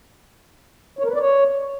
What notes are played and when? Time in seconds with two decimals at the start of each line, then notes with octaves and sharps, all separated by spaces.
0.99 C#5
1.04 A#4
1.09 B4
1.14 D5
1.20 C#5